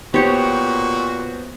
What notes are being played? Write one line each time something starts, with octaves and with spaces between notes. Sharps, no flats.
A#2 B3 F#4 G4 C5 C#5